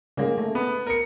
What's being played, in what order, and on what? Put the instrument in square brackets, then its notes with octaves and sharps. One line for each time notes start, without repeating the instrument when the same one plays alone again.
[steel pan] C#3 G#3 [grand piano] A#3
[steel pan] A3
[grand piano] B3
A#4 C#7